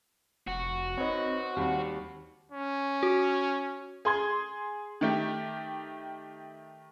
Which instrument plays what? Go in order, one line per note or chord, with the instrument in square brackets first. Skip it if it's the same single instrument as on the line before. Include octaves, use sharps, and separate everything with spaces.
[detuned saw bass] F1 [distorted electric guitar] F#4
[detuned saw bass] C4 [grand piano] D#4 B4 C#5
[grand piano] D#2 G3
[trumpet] C#4
[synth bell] F#4
[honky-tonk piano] G#4 C6 G#6
D#3 A3 G4